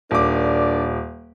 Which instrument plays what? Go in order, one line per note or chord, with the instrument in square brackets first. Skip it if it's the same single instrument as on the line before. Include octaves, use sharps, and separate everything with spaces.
[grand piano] D#1 D6 [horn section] D4 A#4 D5